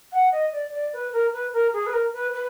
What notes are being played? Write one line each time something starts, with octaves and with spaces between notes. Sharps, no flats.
F#5
D#5
D5
D5
B4
A#4
B4
A#4
G#4
B4
A#4
B4
B4